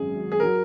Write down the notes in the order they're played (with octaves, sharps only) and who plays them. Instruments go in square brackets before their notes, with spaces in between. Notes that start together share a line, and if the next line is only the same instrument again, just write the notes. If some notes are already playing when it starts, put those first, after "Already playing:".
Already playing: [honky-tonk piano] G#1 F#2 F#3 C#4 [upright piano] G#4
[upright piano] G#4
[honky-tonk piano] F#3 [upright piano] A#4